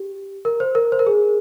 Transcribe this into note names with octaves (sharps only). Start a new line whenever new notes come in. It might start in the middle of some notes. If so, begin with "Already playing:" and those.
Already playing: G4
A#4
C5
A#4
C5
A#4
G#4